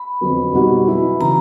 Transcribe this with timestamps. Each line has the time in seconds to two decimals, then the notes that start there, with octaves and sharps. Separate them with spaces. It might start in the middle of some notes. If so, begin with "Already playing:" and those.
Already playing: B5
0.21 F2 D3 F#3 B3
0.53 B2 G3 C4 D#4 F#4
0.87 F#3 B3 E4 G#4
1.21 C#3 E3 A#5